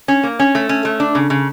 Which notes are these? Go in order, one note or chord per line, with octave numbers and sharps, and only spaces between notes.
C#4
A#3
C#4
A3
C#4
A3
D4
C#3
C#3